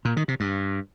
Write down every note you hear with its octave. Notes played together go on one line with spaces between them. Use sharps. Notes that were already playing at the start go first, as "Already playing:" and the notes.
A#2
D#3
C3
G2